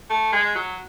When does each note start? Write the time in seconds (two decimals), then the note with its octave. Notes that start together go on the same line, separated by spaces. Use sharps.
0.10 A3
0.32 G#3
0.55 F#3